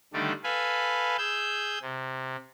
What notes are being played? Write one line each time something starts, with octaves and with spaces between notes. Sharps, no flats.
D3 D#3 G3 A3 D5
A4 B4 F5 G#5 B5
G#4 E6 G6
C3